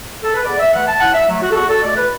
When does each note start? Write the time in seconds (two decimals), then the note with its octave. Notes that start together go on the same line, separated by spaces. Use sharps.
0.23 A4
0.34 B4
0.45 E2 D5
0.59 E5
0.73 E3 A3 F#5
0.87 A5
1.00 A2 F#5
1.14 E5
1.27 F#3 A3
1.41 F#4
1.51 A4
1.55 E2 F#4
1.69 A4
1.82 B2 A3 D5
1.96 B4